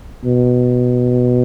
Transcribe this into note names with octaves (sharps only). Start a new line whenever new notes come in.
B2